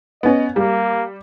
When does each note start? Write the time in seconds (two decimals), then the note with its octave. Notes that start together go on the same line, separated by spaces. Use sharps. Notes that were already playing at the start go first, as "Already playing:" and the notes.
0.23 B3 C#4 D#5
0.56 G3 A#3